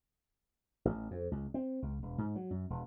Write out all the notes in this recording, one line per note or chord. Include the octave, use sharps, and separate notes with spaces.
A1
F2
C#2
C4
C#2
E1
G#2
F#3
F#2
E1